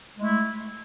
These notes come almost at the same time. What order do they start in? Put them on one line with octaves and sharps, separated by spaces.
G#3 A3 E4